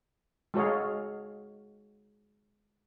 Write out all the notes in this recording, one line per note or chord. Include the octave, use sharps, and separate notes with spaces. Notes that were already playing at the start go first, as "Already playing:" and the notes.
G#3 F#4 A4 C#5 D#5 F5